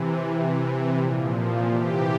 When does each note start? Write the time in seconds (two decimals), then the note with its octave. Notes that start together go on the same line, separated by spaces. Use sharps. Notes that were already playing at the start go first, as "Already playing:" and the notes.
Already playing: C3 E3
0.27 C3 E3
0.98 A#2 F3
1.68 C3 E3 G4